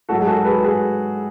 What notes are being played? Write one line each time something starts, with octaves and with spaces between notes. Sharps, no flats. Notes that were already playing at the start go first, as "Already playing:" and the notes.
G#2 F#3 F#4 A4
G#4
F#4 A4
G#4 B4
G#4 B4